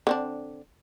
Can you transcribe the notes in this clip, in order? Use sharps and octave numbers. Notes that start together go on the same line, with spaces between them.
D3 C4 D4